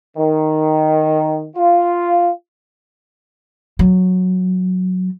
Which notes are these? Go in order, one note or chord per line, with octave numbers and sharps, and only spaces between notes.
D#3
F4
F#3